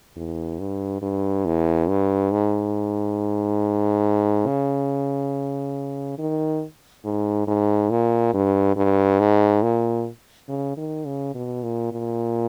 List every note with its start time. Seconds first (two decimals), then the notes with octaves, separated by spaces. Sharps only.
0.16 E2
0.60 G2
1.02 G2
1.46 E2
1.89 G2
2.32 G#2
4.46 C#3
6.18 D#3
7.05 G#2
7.47 G#2
7.90 A#2
8.34 G2
8.77 G2
9.20 G#2
9.63 A#2
10.49 C#3
10.77 D#3
11.06 C#3
11.34 B2
11.63 A#2
11.92 A#2